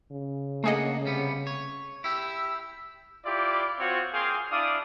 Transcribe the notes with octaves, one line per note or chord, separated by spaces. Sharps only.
C#3
A3 A#3 D4 G#4 D#5 F#5
C3 G3 B3
C#5
E4 G4 E6
E4 F4 G4 D5
C4 F4 F#4 C5 C#5
A#3 G#4 F5 G5 C6
D4 E4 D5 F5 D#6